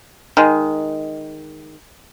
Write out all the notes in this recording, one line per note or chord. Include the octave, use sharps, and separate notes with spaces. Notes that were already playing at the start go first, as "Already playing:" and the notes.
D#3 G#3